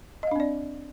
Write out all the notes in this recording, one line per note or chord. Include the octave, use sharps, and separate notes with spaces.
C4 D4 D5 D#5 F5